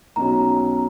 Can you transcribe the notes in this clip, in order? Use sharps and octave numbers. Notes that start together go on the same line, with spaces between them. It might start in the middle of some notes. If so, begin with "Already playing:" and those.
B1 B2 F#3 C#4 A#5